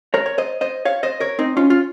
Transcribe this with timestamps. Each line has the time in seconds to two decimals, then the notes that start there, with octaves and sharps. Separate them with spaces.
0.14 A#4 C#5
0.26 C#5
0.38 C5 D#5
0.61 C5 D#5
0.85 C#5 F5
1.03 C5 D#5
1.20 A#4 C#5
1.39 C4 D#4
1.57 C#4 F4
1.70 F4